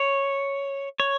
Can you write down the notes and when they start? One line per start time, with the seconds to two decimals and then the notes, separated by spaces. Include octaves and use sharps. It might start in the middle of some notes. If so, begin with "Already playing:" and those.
Already playing: C#5
1.00 C#5